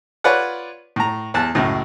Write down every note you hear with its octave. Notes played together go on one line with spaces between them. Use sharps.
F4 B4 C#5 D5 F#5
A2 A#5
E2 A5 F#6
C#2 F#2 A2